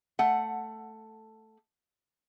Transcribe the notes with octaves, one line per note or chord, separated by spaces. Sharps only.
A3 F#5